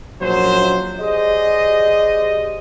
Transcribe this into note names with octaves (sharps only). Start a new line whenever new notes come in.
A#1 F#2 F#3 C5
G4 G#4 C5 D5 D#5